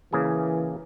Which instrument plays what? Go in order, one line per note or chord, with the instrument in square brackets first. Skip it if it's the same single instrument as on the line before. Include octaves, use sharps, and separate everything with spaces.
[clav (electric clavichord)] C#3 A#3 G#4 [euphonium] E3